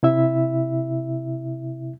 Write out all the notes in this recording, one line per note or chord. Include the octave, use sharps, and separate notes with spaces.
C3 E4 E5